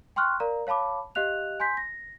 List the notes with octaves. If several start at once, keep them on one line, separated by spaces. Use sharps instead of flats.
G5 C6 C#6 F6 F#6
A#4 D5 F5 A#5
C#5 F5 A5 B5 D6
G4 D#5 F5 F#6 F7
G#5 C6 G6 B6
A#6